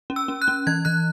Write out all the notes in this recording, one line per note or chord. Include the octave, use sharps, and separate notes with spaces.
C#4
E6
C#4
F#6
C#4
E3 G#6
E3 F#6